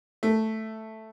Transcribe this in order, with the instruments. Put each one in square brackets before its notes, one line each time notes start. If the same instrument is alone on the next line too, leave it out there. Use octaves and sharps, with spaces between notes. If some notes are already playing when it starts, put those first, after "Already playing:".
[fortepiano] A3